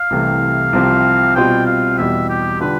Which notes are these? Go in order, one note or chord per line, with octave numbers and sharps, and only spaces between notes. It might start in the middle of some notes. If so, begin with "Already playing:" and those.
Already playing: F5
C2 C3 E3 A3
C2 C3 F3 C4 G4
B2 G3 C4 F4 G5
F5
E2 B2 G3 E5
G4
D3 G3 D4 F4 B4